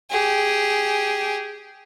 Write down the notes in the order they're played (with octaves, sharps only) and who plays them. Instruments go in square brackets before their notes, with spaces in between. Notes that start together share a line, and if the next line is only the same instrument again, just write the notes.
[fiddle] G4 G#4